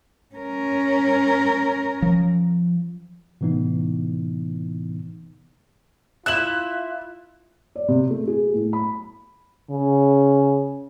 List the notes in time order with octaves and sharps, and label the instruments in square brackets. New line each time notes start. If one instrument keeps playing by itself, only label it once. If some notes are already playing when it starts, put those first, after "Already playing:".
[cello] C#4 A#4
[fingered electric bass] F3
[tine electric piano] A2 C3 E3 B3 D#4
[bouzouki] E4 E5 [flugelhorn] F4 [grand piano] F#6 E7 F#7
[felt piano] D5
C3
A3
G#4
A2
B5
[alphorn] C#3